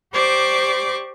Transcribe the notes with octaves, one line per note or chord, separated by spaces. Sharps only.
G4 C5 D5 C#6 D6